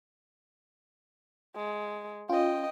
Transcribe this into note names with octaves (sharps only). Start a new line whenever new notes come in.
G#3
C#4 F4 D#5 G5